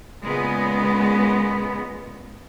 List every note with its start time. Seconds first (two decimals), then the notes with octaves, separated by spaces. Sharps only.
0.24 A#2 C#3 G#3 B3